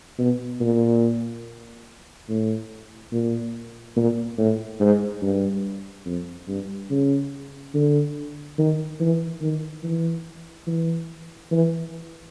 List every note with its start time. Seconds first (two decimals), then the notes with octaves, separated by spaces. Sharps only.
0.19 B2
0.60 A#2
2.29 A2
3.12 A#2
3.96 A#2
4.38 A2
4.80 G#2
5.22 G2
6.06 F2
6.48 G2
6.91 C#3
7.74 D3
8.58 D#3
9.00 E3
9.41 D#3
9.83 E3
10.67 E3
11.51 E3